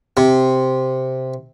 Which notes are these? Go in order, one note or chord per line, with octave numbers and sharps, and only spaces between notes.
C3